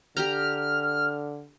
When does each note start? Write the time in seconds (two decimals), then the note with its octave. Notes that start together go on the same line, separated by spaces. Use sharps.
0.17 D3 G4 G5 A#5 F6